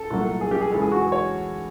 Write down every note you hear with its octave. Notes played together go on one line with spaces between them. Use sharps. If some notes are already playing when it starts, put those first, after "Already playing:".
Already playing: A4
C2 A#2 F#3 A3
G#4
G4
G#4
E2 C#3 E3 G#3 A4
G#4
F#4
G#4
C#5